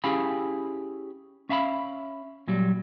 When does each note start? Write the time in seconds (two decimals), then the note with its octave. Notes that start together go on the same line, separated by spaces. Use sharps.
0.04 C#4 E4 G4 G#4 F5 B5
1.49 C#4 E5 F5 A#5 B5
2.48 A#2 F#3 G3